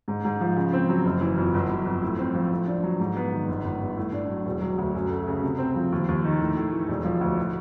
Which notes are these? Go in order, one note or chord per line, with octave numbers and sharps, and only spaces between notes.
G#2
G#2
F3
C#3
C4
F#3
F#1
E3
F2
G1
F#3
F2
A2
C4
F3
A2
D4
F#3
G#2
B3
D#3
G1
G1
G2
A2
D4
F#3
E1
F#3
D2
F#2
A3
C#3
C3
C4
F3
D#2
D#2
D#3
A2
A2
E3
E1
F3
D2
A2